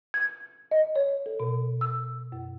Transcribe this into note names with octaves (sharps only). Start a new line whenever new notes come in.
G#6
D#5
C#5
A4
B2
E6
F#2